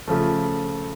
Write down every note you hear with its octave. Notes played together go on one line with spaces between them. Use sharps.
C#3 F3 A3